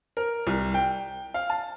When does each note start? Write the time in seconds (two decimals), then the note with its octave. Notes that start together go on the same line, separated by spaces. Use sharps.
0.17 A#4
0.47 C2
0.74 G5
1.34 F5
1.50 A5